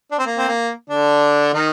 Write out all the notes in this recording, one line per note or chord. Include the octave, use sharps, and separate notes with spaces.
D4
C4
A#3
C4
A#3
D3 D4
D#3 D#4